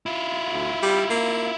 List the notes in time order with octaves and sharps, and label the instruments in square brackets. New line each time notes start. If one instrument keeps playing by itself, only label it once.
[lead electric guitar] E4 F4
[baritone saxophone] D2
G3
A#3